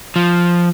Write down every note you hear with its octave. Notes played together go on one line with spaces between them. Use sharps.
F3